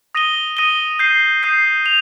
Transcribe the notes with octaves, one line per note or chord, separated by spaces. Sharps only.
D#6 A#6 D#7 G7
D#6 A#6 D#7 G7
D#6 G6 C7 D#7
D#6 G6 C7 D#7
F7